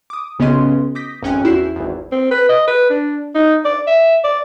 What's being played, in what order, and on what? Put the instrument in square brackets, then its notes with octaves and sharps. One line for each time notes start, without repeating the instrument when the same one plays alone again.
[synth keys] D6 D#6
B1 C#3 B3 C#4 D#5 C6
D6 D#6 G6 A#6 B6
G#1 F2 C#4 G5 G#5 F#6
E2 E4 F#4 G6 C7 E7
G#1 E2
[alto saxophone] C4
B4
D#5
B4
D4
D#4
D5
E5
D5